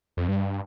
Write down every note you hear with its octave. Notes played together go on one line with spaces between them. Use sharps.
F2
G2